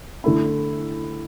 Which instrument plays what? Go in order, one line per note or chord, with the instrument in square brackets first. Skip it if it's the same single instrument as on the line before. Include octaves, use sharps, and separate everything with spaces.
[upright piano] D3 A3 E4